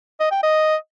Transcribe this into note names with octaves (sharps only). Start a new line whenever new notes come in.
D#5
G5
D#5